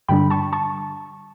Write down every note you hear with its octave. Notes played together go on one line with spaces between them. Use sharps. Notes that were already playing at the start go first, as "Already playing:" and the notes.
G2 D3 G3 D4 G5 B5
A5 C#6
A5 C#6